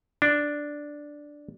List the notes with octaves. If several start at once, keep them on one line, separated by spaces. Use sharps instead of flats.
D4